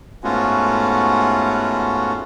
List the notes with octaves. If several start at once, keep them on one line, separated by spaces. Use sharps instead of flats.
G#2 A3 B3 C#4 F4 F#4